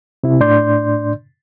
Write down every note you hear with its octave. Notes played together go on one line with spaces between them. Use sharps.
C3 E4
A2 D4 D5 C6 G6